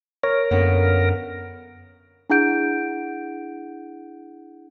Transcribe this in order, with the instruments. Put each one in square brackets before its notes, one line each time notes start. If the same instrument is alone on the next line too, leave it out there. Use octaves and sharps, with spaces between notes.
[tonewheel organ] A#4 [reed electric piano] C#5
[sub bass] F#2 [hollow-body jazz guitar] D3 A#3 B3
[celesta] D4 E4 G#4 F#5 G6 D7